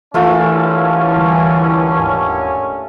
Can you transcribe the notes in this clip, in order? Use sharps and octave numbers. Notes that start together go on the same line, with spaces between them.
D#2 D3 E3 A3 C#4 F4
D2 G3
D#1 G#2